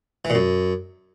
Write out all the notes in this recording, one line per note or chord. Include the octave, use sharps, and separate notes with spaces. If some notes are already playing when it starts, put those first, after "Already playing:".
E3
A#2
F#2